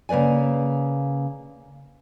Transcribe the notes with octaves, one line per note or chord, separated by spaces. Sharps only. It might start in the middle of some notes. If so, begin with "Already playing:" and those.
C#3 A#3 B4 D5 G#5